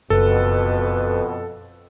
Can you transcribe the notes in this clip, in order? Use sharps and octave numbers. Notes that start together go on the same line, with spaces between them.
F#1 F2 B2 A4 B4